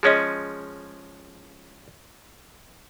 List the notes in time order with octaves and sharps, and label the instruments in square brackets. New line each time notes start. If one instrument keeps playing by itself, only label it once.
[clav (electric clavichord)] F3 G#3 C#4 [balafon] G#4 C#5 D#5